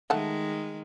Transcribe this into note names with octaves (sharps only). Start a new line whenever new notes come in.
D#3 G#3 A3 A4 F#5